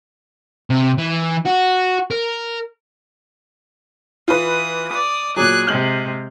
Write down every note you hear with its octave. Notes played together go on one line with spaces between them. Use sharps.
C3
E3
F#4
A#4
E3 F4 B4 D#6
D5 D#6
A#2 F#3 G#4 D5 F#6
C3 G#3 F6 G6 F#7